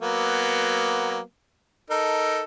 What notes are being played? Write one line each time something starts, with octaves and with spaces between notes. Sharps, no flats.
F#3 A#3 B3
D#4 A4 A#4